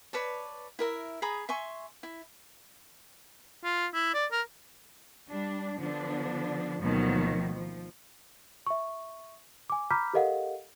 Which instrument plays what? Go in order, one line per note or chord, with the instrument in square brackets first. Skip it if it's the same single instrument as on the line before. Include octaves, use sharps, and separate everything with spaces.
[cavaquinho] B4 C#5 D5 A5
E4 A#4 E5
G#4 A#5 B5 D#6
E5 G#5 C6 C#6
E4
[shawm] F4
E4
D5
A#4
[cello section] G3 D4
D3 F3 B3 D4
D2 B2 D#3 F3 F#3 A#3
F3
[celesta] E5 C#6
G#5 D6
A#5 B5 D6 F6 G6 B6
G4 A4 A#4 D#5 F5 F#5